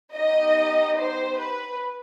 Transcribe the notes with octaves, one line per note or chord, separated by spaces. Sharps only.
B3 D#4 G4 D#5
C5
B4